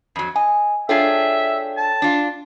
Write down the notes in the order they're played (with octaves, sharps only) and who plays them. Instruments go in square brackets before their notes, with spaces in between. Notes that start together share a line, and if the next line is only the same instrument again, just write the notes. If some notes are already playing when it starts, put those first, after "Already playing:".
[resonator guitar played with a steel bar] F2 F#3
[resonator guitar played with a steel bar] D#5 [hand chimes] G#5
[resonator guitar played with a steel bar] D4 F4 G#4 [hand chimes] A4 C#5 G5 [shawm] E5
[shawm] A5
[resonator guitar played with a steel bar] D4 F4